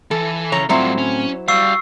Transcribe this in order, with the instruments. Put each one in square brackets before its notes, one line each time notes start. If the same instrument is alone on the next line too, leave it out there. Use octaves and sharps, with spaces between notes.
[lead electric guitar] E3 [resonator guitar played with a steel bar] A4
[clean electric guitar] C#3 E4 A#5 [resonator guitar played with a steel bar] C#5
[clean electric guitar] A2 C4 [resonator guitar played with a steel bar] F#3 E4 C5 [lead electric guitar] G3 F4
[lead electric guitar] C#4
[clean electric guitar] G3 [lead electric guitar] F#4 F5 [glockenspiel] C#6 E6 C7